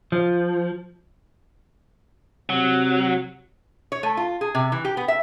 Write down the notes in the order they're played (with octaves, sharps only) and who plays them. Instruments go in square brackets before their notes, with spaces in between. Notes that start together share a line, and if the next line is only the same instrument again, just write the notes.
[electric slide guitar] F3
[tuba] C3 [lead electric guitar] F#3
[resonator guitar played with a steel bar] C#5
A3
F4
G#4
C3
E3
G4
B3
E5